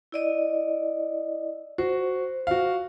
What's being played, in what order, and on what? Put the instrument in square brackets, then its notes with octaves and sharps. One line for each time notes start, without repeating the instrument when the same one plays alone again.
[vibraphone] E4 D5 D#5
[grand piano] F#4 [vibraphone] C5
[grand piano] F#4 F5